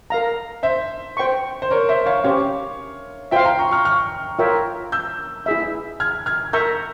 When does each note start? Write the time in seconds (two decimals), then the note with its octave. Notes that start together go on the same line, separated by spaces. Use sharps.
0.10 A#4 F5 A#5
0.63 C5 E5
1.17 C5 G5 C#6
1.62 C5
1.71 A#4 C#5
1.89 C5 E5
2.06 C#5 F5
2.24 C#4 G4 C5 C#5 F5
3.31 F4 C5 E5 F5 G5
3.44 G5 A#5
3.59 A#5 C#6
3.71 C#6 F6
3.85 C#6 F6
4.39 F4 A#4 C#5 E5 G5
4.92 E6 G6
5.46 E4 G#4 E5
6.00 F6 G#6
6.26 F6 G#6
6.53 A#4 E5 A#5 C#6 E6 G6